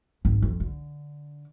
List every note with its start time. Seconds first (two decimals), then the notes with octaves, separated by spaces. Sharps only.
0.25 G#1
0.42 F2
0.60 D3